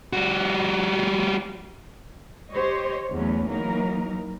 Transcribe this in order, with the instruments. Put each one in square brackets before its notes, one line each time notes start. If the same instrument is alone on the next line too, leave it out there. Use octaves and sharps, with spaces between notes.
[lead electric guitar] G3 F#4
[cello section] G4 C5 C#5 D#5
E2 E3 F#3 A3 C#4
E3 F#3 A#3 D#4 A#4